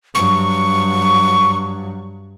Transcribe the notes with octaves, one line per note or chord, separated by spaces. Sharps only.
G2 F#3 C#6